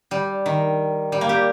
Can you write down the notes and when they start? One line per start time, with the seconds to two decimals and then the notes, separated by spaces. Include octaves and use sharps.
0.11 G3
0.46 D#3
1.12 G3
1.21 A#3
1.29 G4